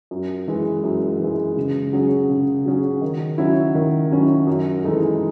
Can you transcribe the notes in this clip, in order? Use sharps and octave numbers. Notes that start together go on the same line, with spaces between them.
F#2
E3 G#3
F#2
E3 G#3
C#3
F#3 C#4 G#4
C#3
F#3 C#4 G#4
D#3
F#3 C#4 E4
D#3
F#3 C#4 E4
F#2
E3 G#3 D#4 A4